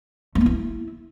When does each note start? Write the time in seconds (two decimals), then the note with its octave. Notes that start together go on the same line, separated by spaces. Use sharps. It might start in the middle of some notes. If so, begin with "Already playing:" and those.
0.35 A3
0.41 B3
0.46 E4